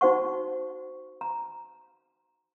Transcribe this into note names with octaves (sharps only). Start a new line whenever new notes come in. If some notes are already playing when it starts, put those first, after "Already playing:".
D#4 F#4 C5 F#5 C#6
A#5